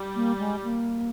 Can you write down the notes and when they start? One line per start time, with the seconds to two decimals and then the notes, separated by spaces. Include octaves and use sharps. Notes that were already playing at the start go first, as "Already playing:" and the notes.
Already playing: G3
0.15 A#3
0.39 G#3
0.63 A#3